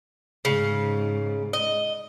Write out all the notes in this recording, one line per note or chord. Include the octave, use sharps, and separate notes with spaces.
G#2 C#3
D#5